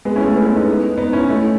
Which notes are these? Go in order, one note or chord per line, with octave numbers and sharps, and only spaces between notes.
G#3 B3
C#4 E4
A3 C#4
G#3 B3
G#3 B3
B3 D#4
B3 D#4
C#4 E4
A3 C#4